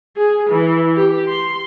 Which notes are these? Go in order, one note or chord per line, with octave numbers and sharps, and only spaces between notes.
G#4
E3
G4
C6